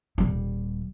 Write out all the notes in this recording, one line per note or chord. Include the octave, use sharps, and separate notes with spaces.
D#1 G3